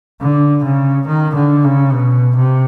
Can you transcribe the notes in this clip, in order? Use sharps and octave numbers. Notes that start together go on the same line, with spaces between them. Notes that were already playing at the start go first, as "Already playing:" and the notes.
D3
C#3
D#3
D3
C#3
B2
C3